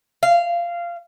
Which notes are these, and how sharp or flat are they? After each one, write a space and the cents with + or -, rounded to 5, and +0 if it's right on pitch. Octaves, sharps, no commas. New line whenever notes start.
F5 -15